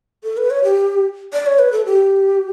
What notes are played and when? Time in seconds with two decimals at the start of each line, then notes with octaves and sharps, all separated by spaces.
0.23 A4
0.37 B4
0.50 C#5
0.64 G4
1.33 D5
1.46 C#5
1.59 B4
1.72 A4
1.85 G4